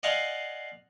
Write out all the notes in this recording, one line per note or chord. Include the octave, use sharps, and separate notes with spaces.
D5 D#5 F5 F#5 G#5 C6